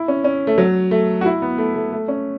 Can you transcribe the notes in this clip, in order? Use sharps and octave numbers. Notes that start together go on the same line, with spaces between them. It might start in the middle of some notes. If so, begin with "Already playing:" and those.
Already playing: E4
C#4
C#4
A3
F#3
A3
F#4
E4
B3
A3
A3
A3
C#4